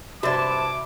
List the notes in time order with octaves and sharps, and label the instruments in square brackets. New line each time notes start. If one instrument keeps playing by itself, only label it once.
[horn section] G2 C5 A5 [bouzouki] C3 E4 [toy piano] F#4 D5 [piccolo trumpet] D6